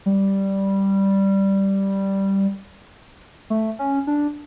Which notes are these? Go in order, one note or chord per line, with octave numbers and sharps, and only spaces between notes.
G3
A3
C#4
D4